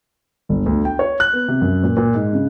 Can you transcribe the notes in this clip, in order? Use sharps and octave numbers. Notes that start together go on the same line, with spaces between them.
G1
D2
G5
C#5
F#6
B3
C3
F#2
A#2
A#2
G#2
C#3